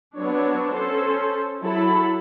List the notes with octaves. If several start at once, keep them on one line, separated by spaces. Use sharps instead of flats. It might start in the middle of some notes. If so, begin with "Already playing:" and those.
F#3 B3 C4 D4 C#5
C#4 A4 C5
F#3 E4 A4 B5